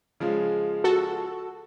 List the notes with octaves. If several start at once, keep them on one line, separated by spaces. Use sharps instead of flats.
C#3 F3 G#3
F#4 A4